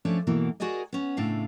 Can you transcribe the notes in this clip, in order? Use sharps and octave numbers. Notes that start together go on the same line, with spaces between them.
F3 A3 C#4 D4 C#5 D5
B2 E3 A#3
F#4 G#4 A#4 D5 D#5
B3 C#4
A2 C#3 D4 E5 F5